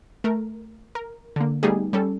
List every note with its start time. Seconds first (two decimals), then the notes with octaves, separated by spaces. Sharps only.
0.24 A3 A#4
0.95 A#4
1.36 D3 A#3
1.63 G3 A3 B3 D#4 G4 G#4
1.93 G3 C#4 A4